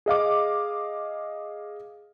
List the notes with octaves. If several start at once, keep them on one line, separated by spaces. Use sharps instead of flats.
G#4 D#5 F5 D6